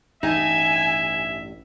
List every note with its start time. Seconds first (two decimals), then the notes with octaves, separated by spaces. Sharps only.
0.23 A1 G2 E3 D#4 E5 G#5